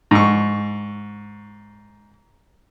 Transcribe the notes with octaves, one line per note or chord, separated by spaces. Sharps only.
G#2 C#6